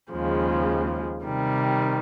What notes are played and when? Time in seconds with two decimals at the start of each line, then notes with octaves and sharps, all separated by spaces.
0.12 D#2 C#3 F3 G#3
1.26 C3 D#3 G3